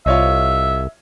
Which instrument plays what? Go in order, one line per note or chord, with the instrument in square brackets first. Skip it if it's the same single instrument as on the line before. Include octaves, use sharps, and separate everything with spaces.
[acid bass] C2 [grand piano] F4 C#5 D#5 [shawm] E5